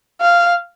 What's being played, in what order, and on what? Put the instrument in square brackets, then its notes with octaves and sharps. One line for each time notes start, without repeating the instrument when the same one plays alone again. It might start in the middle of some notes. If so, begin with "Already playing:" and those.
[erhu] F5